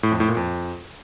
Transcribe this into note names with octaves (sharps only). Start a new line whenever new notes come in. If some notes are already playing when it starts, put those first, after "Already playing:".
A2
F2
A2
A#2
F2